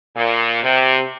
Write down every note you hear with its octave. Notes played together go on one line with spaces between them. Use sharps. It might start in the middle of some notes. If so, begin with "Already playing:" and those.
A#2
C3